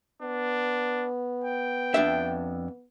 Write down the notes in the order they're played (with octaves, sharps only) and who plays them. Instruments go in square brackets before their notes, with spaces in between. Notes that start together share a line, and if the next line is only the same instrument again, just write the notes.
[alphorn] B3 [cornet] D4
[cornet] G5
[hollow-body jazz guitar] F2 D4 E5